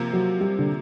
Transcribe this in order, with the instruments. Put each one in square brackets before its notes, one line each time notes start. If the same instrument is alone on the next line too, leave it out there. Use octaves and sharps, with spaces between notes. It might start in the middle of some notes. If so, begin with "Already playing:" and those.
Already playing: [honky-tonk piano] C3 F3 A#3
[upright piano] F#3
G3
D3